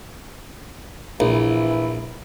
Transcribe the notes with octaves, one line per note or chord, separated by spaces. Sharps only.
A#1 E3 E4